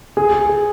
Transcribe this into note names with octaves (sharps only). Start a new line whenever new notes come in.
G#4
G#4
G#4